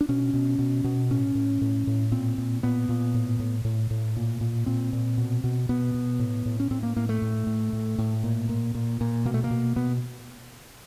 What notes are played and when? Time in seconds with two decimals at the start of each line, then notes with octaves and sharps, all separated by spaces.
0.01 D4
0.09 B2 C#4
0.34 B2
0.59 B2
0.84 B2
1.11 A2 C#4
1.35 A2
1.61 A2
1.87 A2
2.12 A#2 C4
2.38 A#2
2.63 A#2 B3
2.89 A#2
3.14 A2
3.40 A2
3.65 A2
3.91 A2
4.17 A#2
4.41 A#2
4.66 A#2 C4
4.93 A#2
5.18 B2
5.44 B2
5.69 B2 B3
5.95 B2
6.19 A2
6.46 A2
6.60 C#4
6.71 A2 C4
6.83 A#3
6.96 A2 A#3
7.09 A3
7.22 A2
7.47 A2
7.73 A2
7.98 A2
8.24 A#2
8.49 A#2
8.75 A#2
9.01 A#2
9.25 B2 A#3
9.34 A3
9.44 A#3
9.51 B2
9.76 B2 B3